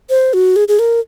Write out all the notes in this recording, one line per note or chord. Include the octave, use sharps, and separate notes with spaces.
C5
F#4
G#4
G#4
A#4